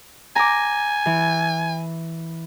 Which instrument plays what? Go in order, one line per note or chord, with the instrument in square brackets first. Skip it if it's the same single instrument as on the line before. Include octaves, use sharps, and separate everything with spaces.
[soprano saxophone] G#5 [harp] A#5 D6
[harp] E3